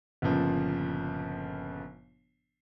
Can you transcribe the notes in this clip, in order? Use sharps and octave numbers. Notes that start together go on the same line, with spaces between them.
G1 A#2 C#3 F3